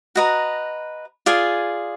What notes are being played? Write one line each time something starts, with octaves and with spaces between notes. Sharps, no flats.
F#4 B4 D#5 A#5
F4 G#4 D5 G#5